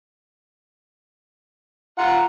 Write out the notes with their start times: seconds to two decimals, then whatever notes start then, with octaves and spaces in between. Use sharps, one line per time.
1.98 F4 F#5 A#5